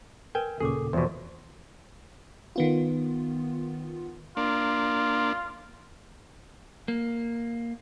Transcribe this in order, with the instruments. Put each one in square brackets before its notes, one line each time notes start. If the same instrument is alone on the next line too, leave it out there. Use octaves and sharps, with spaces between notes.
[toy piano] A#4 B4 [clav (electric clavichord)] G5 G#5
[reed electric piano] D#2 A#2 C#3 [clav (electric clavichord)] G#4 [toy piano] A4 C#6 D6
[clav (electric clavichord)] E2 B2 [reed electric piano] E3 F3 C5
[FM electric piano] D#3 B3 F4
[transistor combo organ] A#3 D4 [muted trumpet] F4
[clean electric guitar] A#3